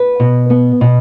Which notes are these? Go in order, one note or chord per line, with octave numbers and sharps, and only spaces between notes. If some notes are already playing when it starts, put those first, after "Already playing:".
Already playing: B4
B2
B3
B2